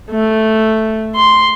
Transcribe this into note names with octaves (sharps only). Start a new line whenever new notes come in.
A3
C6